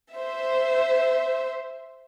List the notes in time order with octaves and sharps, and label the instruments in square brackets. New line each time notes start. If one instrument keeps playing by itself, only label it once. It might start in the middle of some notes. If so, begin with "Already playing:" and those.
[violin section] C5 E5